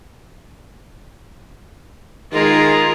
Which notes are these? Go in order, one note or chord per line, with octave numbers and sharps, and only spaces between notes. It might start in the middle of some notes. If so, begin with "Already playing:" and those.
D#3 G#3 F4 G#4 A#4